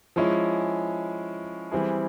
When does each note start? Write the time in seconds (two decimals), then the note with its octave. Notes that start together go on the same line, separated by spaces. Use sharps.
0.16 F3 G#3 C#4 E4
1.71 E3 G3 C4 E4 G#4